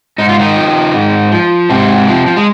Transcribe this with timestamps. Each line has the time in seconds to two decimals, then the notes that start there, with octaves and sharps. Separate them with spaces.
0.18 G#2 D#4
0.29 F4
0.39 D#3 D#4
0.56 F3
0.94 G#2
1.32 F3
1.69 G#2 C3 C4
2.08 F3
2.26 F3
2.36 G#3